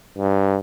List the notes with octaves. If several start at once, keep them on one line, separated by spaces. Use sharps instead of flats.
G2